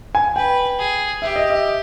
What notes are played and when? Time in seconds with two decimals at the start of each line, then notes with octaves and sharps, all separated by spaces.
0.15 G#5
0.36 B4 G5
0.79 G#4
1.22 G4 E5
1.36 D#5
1.50 E5